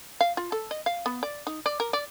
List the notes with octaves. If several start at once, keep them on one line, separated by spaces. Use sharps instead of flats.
F5
F4
A4
D#5
F5
B3
D5
D#4
D5
A#4
D5